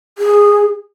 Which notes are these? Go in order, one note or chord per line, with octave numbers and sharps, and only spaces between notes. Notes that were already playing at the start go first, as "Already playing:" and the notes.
G#4